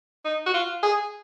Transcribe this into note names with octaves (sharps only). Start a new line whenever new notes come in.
D#4
F#4
F4
G#4